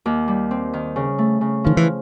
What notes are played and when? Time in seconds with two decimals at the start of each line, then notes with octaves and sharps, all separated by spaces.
0.06 D#2
0.28 G3
0.51 C4
0.74 D#3
0.96 C#3
1.18 A3
1.41 C#3
1.64 D#3 F3
1.77 E3